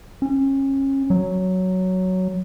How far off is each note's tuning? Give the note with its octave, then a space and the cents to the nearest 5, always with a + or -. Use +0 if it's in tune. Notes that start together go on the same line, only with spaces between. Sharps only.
C#4 -30
F#3 +5